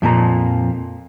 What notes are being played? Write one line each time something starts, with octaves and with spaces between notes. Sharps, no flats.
F2 A#2 F3 A#5